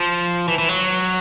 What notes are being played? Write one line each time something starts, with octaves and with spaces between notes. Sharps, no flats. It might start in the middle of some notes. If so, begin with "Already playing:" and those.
Already playing: F3
E3
E3
F#3